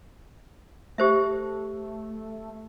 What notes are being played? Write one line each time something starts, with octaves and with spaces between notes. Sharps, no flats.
A3 G4 C5 E5